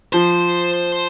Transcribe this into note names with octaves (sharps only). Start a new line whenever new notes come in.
F3 C5